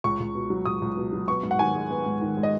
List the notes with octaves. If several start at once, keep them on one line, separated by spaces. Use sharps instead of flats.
C#2 C#6
C#2
B2
F#3
C#2 D#6
C#2
B2
F#3
B3 C#6
G#2
F#5
D#3 G#5
G#3
B3
G#2
D#3
G#3
D#5